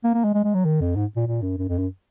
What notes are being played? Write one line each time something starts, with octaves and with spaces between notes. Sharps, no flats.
A#3
A#3
G#3
G#3
G#3
F#3
D#3
F2
G#2
A#2
A#2
F#2
F#2
F2
F#2